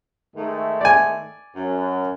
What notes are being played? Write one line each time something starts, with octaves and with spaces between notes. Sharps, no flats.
G#2 D#3 A3
D5 G#5
F#2